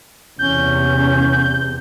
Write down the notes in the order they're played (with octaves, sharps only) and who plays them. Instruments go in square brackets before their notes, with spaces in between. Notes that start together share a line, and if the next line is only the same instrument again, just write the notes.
[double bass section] E2 C3 [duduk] C#4 [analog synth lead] G6